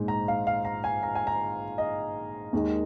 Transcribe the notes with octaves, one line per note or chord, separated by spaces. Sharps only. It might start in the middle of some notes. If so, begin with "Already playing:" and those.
Already playing: A#1 G#2 G#3
A#5
F5
F5
A#5
G#5
A#5
G#5
A#5
D#5
D#2 D#3 G#3